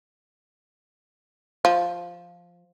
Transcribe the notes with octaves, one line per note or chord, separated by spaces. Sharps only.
F3